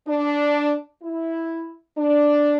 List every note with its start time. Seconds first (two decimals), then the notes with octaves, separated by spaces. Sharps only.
0.08 D4
1.03 E4
1.98 D4